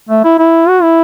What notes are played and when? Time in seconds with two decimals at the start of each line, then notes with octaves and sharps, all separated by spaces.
0.09 A3
0.24 E4
0.39 E4
0.69 F#4
0.82 E4